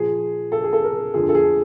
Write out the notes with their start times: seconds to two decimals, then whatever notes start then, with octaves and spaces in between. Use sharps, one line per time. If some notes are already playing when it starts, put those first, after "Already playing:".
Already playing: A#2 F3 G#4
0.52 A4
0.64 G#4
0.73 A4
0.84 A#4
1.14 F2 D3 F3 G#4
1.29 A4
1.35 G#4